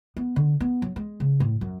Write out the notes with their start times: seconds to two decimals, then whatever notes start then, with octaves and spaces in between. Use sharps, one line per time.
0.17 B3
0.36 D3
0.60 B3
0.82 F#3
0.96 G#3
1.20 C#3
1.40 A2
1.61 F#2